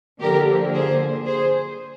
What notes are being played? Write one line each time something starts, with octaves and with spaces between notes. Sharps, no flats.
D3 F3 A#3 G4 A#4
G#4 C5
G#4 C5